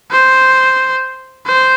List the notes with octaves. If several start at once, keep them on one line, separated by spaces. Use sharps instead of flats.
C5
C5